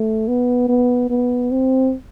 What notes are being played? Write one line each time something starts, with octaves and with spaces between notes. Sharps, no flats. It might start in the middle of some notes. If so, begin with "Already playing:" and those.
Already playing: A3
B3
B3
B3
C4